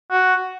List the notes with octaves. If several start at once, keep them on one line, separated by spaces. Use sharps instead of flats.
F#4